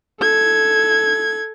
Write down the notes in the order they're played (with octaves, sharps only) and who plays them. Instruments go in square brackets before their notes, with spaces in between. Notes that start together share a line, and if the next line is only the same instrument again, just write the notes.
[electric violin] A4 G#6